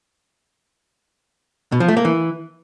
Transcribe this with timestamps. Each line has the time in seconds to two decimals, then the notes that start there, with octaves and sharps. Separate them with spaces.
1.72 B2
1.80 F3
1.88 A3
1.97 A#3
2.05 E3